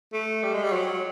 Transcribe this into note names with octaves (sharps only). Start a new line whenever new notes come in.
A3
G3
G#3
G3
F#3